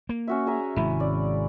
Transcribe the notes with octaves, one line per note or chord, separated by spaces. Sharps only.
A#3
C#4 F#4 E5
G#4 E5 A#5
G#1 C3 G#3 E4
C#4 D5